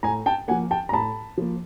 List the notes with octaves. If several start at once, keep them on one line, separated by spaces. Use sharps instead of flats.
A2 G#5 A#5
G5 A5
F3 A#3 F#5 G#5
G5 A5
A#5
A2 A5 B5
F3 A#3